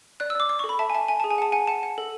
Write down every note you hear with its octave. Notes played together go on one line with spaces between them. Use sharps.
D5 F#6
E6
D5 D6
D5 D6
C#6
A4
B5
E5 A5
G#5
E5 A5
E5 G#5
G#4 A5
G#5
F#5 A5
F#5 G#5
F#5 A5
F#5
A4